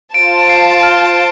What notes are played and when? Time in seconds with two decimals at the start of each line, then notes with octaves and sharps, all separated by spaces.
0.14 F4 C5 A5 D7
0.49 C7
0.83 F6